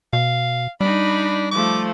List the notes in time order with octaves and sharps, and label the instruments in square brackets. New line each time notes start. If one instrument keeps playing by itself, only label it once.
[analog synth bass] B2 [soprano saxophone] F5
[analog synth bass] G3 [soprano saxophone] D4 [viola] D#4 B5
[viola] F3 A3 [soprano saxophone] D6